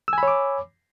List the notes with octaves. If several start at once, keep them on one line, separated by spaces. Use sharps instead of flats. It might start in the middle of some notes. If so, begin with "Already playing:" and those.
C#5 G#5 B5 D6 E6